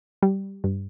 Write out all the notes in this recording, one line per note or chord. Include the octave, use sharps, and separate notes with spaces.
G3
G2